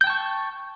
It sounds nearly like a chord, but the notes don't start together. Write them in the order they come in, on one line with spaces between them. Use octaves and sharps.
G6 G5 A5 C#6